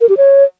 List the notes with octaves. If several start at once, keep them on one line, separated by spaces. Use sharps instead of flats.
A#4
G4
C#5